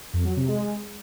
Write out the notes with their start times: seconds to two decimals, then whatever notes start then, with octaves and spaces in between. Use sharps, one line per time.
0.13 F2
0.25 F#3
0.37 C3
0.48 G#3